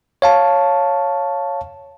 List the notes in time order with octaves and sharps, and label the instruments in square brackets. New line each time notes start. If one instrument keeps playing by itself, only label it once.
[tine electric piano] C#5 F5 A5